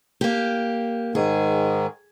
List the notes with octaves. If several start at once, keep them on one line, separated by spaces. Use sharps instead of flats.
A#3 G4
G#2 D#3 G#4